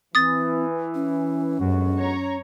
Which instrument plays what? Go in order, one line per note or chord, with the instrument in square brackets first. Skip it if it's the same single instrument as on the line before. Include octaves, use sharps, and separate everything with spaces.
[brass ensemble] E3 [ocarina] C4 [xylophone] D#6 A6
[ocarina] C#4
[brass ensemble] G1 G#3 F#4 [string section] F#2
[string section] C#5 A#5